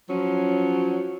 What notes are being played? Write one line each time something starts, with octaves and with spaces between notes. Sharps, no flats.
F3 F#3 C#4